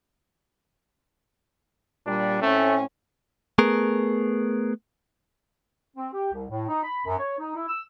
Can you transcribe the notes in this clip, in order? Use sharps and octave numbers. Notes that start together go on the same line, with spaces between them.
A#2 G3 D4
A2 A3 C4 C#4
A3 B3 G#4 A#4
C4
G4
C2
A2
D#4
B5
F#2
C#5
D#4
E4
E6